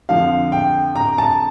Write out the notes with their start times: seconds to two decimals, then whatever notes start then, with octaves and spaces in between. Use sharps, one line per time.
0.09 F2 D3 F3 F5
0.52 G5
0.96 A#5
1.18 A5